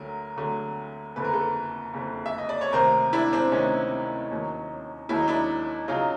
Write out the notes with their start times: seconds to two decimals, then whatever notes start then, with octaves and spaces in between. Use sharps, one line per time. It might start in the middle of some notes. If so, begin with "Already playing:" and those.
Already playing: D2 D3 F#3 A#4
0.37 D2 D3 F#3
1.16 F#1 F2 D3 B4
1.24 A#4
1.33 A4 B4
1.94 F#1 F2 D3
2.26 E5
2.38 D#5
2.49 D5
2.61 C#5
2.73 D2 C3 D#3 A#4 C5
3.13 D4 E4
3.33 C4 D4
3.52 D2 C3 D#3 C#4 D#4
4.31 D#2 D#3 F#3
5.09 D#2 D#3 F#3 E4
5.19 D#4
5.28 D4 E4
5.88 C#3 F#3 D#4 F4